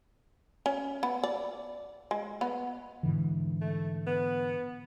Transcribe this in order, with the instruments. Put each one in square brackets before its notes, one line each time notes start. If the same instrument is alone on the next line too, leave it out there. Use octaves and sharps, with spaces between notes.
[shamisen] C#4
B3
D5
G#3
B3
[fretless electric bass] G#2 D3 E3
[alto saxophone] A3
B3